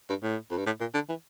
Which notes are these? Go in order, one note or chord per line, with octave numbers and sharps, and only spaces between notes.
G2
A2
F2
G2
A2
A#2
D3
E3